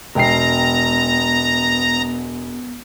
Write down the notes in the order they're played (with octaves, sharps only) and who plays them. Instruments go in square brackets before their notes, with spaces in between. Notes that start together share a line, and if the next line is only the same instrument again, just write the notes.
[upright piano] E1 G5 C7 [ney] B3 [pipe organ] A#5